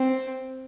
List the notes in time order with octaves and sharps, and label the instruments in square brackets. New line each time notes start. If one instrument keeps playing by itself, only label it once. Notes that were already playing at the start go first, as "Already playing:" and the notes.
Already playing: [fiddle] C4